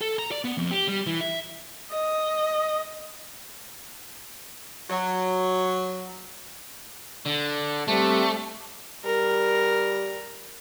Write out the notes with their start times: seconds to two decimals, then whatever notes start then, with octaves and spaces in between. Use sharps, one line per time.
0.01 A4
0.19 A#5
0.31 D5
0.44 B3
0.58 F2
0.71 G4
0.88 G3
1.07 E3
1.21 E5
1.91 D#5
4.90 F#3
7.26 D3
7.88 G3 A3 C4 D4
9.05 G3 A#4